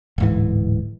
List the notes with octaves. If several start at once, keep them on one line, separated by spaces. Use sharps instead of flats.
D1 G#2 E3